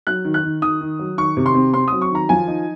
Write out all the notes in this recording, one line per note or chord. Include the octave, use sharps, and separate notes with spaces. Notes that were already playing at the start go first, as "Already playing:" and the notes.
F#3 F#6
D#3
F#6
D#3
D#3 D#6
D#3
F#3
D#3 C#6
C3
C6
C4
C4 C6
F#3 D#6
C#6
D#3 A#5
F3 G#5
D#4